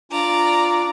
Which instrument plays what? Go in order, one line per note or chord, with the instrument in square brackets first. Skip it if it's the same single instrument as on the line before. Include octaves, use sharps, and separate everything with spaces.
[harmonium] D4 F4 [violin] D5 A#5